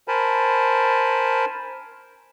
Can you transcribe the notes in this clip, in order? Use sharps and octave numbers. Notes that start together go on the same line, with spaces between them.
A#4 C5 G#5 A5 B5